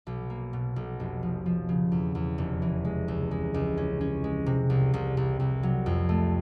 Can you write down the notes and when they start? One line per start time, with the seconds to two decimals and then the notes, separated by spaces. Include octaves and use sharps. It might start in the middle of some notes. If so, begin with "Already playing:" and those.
0.07 B1
0.30 A#3
0.53 B2
0.76 B1
1.00 F1
1.23 F3
1.46 F3
1.69 C#3
1.92 E2
2.15 E2
2.38 F1
2.62 E3
2.85 G#3
3.08 C#2
3.31 G#3
3.54 C#2
3.77 C#4
4.01 C#4
4.24 G#3
4.46 C3
4.70 C2
4.94 C2
5.17 C2
5.40 C2
5.63 F#3
5.86 F2
6.09 A3